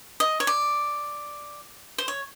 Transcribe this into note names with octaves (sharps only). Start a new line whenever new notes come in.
D#5
C#5
D5
C5
C#5